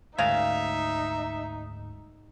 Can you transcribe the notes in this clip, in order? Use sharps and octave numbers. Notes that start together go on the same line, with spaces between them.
D2 G#2 C#3 D#4 A#4 E5 F5